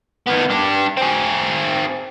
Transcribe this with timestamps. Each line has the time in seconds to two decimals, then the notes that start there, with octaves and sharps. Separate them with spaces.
0.26 D#3 B3
0.50 D4 G4
0.97 C4 G#4